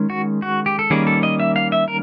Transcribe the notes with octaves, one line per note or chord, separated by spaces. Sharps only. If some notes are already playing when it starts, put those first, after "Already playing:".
Already playing: D#3 G#3 C#4
F#4
F#4
G4
A4
D#3 G3 A#3 C#4 G#4
A4
D#5
E5
F5
E5
A#4